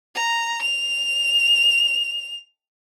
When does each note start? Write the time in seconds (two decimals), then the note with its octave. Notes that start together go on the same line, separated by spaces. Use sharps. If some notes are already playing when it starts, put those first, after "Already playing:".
0.15 A#5
0.62 F7